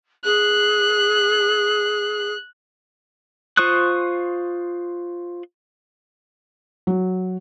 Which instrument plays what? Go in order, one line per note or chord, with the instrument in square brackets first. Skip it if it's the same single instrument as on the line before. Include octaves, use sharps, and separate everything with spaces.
[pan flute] G#4 [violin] F#6
[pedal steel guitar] F4 C5 C#6 D#6 F#6
[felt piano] F#3